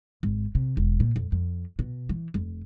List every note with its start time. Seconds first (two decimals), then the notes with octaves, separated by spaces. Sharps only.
0.23 G#1
0.55 C3
0.77 E1
1.00 A#2
1.16 F2
1.32 F2
1.79 B2
2.09 E3
2.34 F1